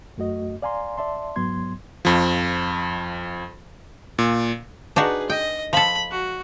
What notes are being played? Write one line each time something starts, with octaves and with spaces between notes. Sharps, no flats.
F#2 A3 F#4 D#5
D5 F5 G#5 A#5 C6
D5 E5 A5 C6
G#2 F#3 B3 C6 G#6
F2 F3
A#2
D4 D#4 F#4 G#4 B4
D#5 G5
F3 A4 B5
F#4